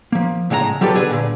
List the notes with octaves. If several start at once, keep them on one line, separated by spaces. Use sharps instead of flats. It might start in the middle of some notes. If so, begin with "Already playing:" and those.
F3 A#3
A2 C#3 G#3 F#5 A#5
F#3 G3 F4 G4 A4 B4
D3 G#4 B4
A#2 D3